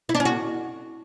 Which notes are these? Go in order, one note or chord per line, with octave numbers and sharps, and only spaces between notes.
E4
D4
C#4
F#4